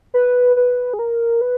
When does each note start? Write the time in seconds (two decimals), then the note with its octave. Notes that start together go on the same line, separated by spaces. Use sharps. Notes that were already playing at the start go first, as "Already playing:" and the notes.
0.14 B4
0.56 B4
0.94 G#4
0.99 A#4
1.41 B4